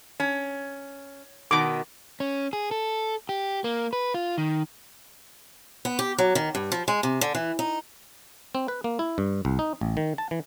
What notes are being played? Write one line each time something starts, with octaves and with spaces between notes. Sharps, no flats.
C#4
B2 D#3 D6
C#4
G#4
A4
G4
A#3
B4
F4
D#3
B3
G4
F#3
D#3
G2
F3
G#3
C3
D3
E3
D#4
C4
B4
A#3
E4
G2
C2
D#4
A1
D#3
A5
E3